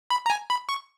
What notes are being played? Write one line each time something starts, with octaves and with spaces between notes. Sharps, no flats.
B5
A#5
G#5
B5
C#6